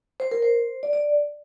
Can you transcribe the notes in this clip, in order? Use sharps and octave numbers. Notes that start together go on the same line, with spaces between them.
C5
A#4
C5
D5
D5